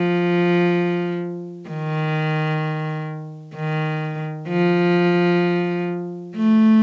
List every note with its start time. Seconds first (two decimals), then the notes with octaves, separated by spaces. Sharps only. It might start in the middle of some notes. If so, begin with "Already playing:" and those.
Already playing: F3
1.69 D#3
3.55 D#3
4.49 F3
6.36 A3